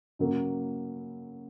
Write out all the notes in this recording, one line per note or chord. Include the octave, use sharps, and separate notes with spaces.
C#3 F#3 A#3